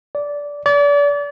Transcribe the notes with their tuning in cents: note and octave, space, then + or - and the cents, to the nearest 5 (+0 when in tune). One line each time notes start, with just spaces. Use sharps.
D5 -15
D5 -35